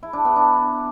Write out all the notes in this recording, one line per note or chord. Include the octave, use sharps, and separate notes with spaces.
E4
D4
B3
D4